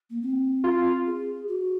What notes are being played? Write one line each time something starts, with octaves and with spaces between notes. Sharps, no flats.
A#3
C4
F4
G#4
F#4